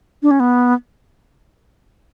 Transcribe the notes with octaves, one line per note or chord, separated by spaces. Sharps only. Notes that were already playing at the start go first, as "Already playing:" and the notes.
D4
C#4
B3